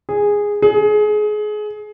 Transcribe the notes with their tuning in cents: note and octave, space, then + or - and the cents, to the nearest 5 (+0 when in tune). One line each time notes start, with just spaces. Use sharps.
G#4 -10
G#4 +25